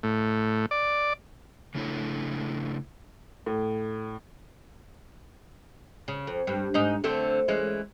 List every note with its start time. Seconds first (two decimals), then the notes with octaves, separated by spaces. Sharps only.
0.03 A2
0.71 D5
1.75 C#3 A3 D4 E4 A4 C#5
3.46 A2
6.08 C#3
6.27 F2
6.47 G2
6.74 G#2 D#4
7.04 D3 A3 C4
7.48 E3 G#3 C#4